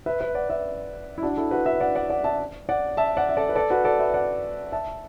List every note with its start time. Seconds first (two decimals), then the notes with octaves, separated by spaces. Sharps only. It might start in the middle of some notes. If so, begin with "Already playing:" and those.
0.06 B4 E5
0.20 B4 E5
0.35 D5 F#5
0.49 B4 E5
1.18 E4
1.23 D4 F#4
1.37 E4 A4
1.51 F#4 B4
1.66 B4 E5
1.80 D5 F#5
1.95 D5 F#5
2.10 D5 F#5
2.24 E5 A5
2.69 D5 F#5
2.97 E5 A5
3.17 D5 F#5
3.29 E5
3.37 A4 D5
3.49 B4
3.55 A4 D5
3.70 F#4 B4
3.84 A4 D5
3.99 B4 E5
4.14 D5 F#5
4.72 E5 A5